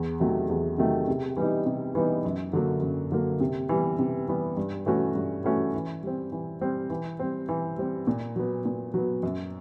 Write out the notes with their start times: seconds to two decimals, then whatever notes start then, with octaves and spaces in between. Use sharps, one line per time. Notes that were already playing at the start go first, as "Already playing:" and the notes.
Already playing: E2
0.20 C3 D#3 F#3 A3
0.50 E2
0.78 C3 D#3 F#3 A3
1.08 C3
1.36 E3 G3 B3 D#4
1.66 C3
1.95 E3 G3 B3 D#4
2.25 F#2
2.53 D3 F#3 A#3
2.82 F#2
3.12 D3 F#3 A#3
3.40 C3
3.69 E3 G3 B3
3.99 C3
4.28 E3 G3 B3
4.57 G2
4.86 E3 A3 C#4 F#4
5.15 G2
5.44 E3 A3 C#4 F#4
5.74 E3
6.03 G3 C4
6.32 E3
6.61 G3 C4
6.90 E3
7.19 G3 C4
7.49 E3
7.78 G3 C4
8.07 A#2
8.36 F#3 B3
8.65 A#2
8.94 F#3 B3
9.23 F#2